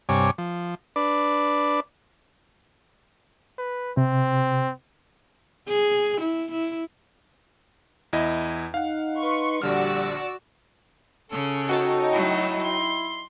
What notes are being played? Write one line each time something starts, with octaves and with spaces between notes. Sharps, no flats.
G2 C3 C#5 G#5 D6
F3
D4 B4 D5
B4
C3 C4
G#4
E4
E4
E2 E4 D#5
D#4 F5 F#5
B4 C6 C#6
A#1 D3 G3 F#4 D5 E6 F6
C#3 C#4 A4
D#4 F#4 C#5 G5 A5
F#3 A3 E4
C6